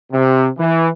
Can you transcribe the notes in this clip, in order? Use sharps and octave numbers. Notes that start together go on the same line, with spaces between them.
C3
E3